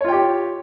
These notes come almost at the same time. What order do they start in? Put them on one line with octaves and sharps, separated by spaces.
C#5 F4 G5 G4